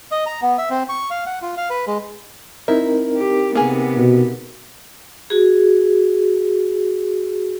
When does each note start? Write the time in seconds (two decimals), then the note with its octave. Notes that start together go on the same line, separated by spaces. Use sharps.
0.11 D#5
0.26 A#5
0.42 B3
0.58 E5
0.70 C4
0.89 C#6
1.11 F5
1.26 F#5
1.42 F4
1.57 F5
1.70 B4
1.87 G#3
2.68 C4 D#4 E4 A#4
3.16 G4
3.55 C3 A#3 B3 G#4
3.98 B2
5.30 F#4 G#4